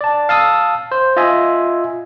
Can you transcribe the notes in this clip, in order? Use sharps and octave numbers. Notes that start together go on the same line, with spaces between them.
D5 A5
F5 A5 D#6 E6
C5
F4 D#5 E5 G#5